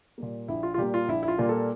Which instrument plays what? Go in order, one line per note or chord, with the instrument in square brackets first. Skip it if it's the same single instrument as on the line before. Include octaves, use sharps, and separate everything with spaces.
[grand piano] A#2 G3 A#3
A#1 E4
F4
F4
A#2 G3 A#3 G4
F4
A#1 E4
E4
F4
A#2 G3 A#3
A4